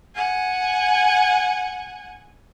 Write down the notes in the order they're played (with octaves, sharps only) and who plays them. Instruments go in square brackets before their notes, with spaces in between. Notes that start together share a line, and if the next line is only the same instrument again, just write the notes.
[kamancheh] F#5 G#5